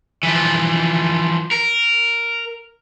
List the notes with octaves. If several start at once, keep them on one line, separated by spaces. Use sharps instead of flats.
E3 F3
A#4